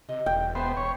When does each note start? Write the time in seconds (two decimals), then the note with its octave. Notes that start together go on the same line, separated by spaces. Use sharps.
0.09 C3 D#5
0.26 E1 G5
0.55 B3 C5 E5 A5
0.77 E1 C#5